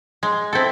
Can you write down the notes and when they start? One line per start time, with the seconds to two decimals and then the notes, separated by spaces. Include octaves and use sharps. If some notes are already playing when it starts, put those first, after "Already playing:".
0.23 G#3
0.53 C4 E4 A4